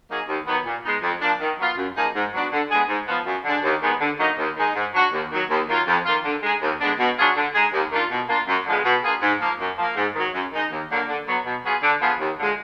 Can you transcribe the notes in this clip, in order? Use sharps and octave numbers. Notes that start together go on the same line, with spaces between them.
F#3 A#3 D#4 G#4
D#2
D#3 F#3 B3
A#2
G#3 B3 D#4
F2
F3 A#3 D4
D#3
F#3 B3 F4
F#2
F3 A#3 D#4 G#4
G#2
F#3 B3 D4 F#4
D3
G#3 B3 D4 G#4
G#2
F3 B3
F#2
D3 G#3 D4
D#2
D#3 G#3 B3
D3
F#3 A#3 D#4
D#2
D#3 G#3 D#4 G#4
G#2
F#3 D4 F#4
D#2
D#3 F#3
D#2
D#3 F#3 A#3 F4
F2
D#3 A#3 F4
D3
G#3 D#4 G#4
D#2
D3 G#3 B3 D4
B2
F#3 D4 F4 G#4
D3
G#3 D#4 G#4
D#2
D#3 A#3 D4 F4
B2
A#3 D4 F4
F#2
D3 F3 G#3 B3
B2
A#3 D4 F4 G#4
G#2
F3 A#3
F#2
F3 A#3
G#2
D#3 F#3
F#2
D#3 G#3 D#4
D#2
D3 F#3 A#3 D4
D3
F#3 B3
B2
F#3 B3 F4 G#4
D3
F3 B3 F4 G#4
D#2
D3 F3 G#3